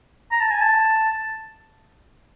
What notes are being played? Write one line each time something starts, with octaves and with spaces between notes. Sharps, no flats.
A#5
A5
G#5
A5